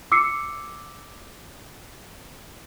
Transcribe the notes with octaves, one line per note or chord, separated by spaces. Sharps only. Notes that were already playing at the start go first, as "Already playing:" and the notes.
D6 E6 C7 C#7